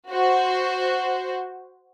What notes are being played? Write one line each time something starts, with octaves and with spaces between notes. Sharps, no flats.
F#4 C5